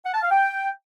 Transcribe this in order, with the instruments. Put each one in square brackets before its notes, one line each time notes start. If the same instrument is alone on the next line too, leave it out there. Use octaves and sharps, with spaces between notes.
[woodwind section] F#5
A5
F5
G5